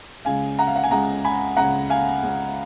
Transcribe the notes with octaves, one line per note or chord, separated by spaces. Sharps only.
C#2 C#3 G#3 F5 G#5
F#5 A#5
F5
F#5
G#5
C#2 C#3 G#3 F#5 A#5
G#5 B5
C#2 C#3 G#3 F#5 A#5
F5 G#5
C#2 C#3 G#3